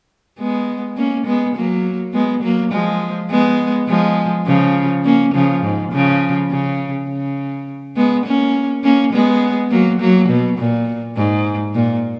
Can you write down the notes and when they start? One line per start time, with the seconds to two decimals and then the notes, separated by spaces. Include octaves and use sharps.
0.39 G#3 B3
0.97 A#3 C#4
1.26 G#3 B3
1.56 F#3 A#3
2.14 G#3 B3
2.43 F#3 A#3
2.72 F3 G#3
3.30 G#3 B3
3.88 F3 G#3
4.46 C#3 F3
5.05 A#3 C#4
5.34 C#3 F3
5.63 G#2
5.92 C#3 F3
6.50 C#3
7.09 C#3
7.96 G#3 B3
8.26 A#3 C#4
8.84 A#3 C#4
9.13 G#3 B3
9.71 F#3 A#3
10.00 F#3 A#3
10.29 B2
10.59 A#2
11.16 G#2
11.74 A#2